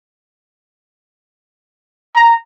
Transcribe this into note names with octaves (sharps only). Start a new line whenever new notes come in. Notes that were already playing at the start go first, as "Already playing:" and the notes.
A#5